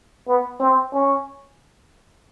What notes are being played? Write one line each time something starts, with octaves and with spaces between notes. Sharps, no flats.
B3
C4
C#4